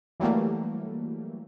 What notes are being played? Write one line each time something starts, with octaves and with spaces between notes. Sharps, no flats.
E3 F#3 G3 A3 A#3